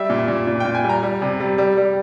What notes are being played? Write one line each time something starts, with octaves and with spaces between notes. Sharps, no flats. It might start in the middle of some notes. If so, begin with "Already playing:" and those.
Already playing: G3 E5
A#2
A#2
A#2
A#2 G5
G#5
G3
A#5
G3
C3
G3
G3
G3